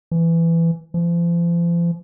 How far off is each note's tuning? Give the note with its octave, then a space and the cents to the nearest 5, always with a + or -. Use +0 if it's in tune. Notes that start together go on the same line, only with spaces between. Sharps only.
E3 +15
F3 -40